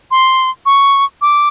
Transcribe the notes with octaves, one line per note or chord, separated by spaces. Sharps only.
C6
C#6
D6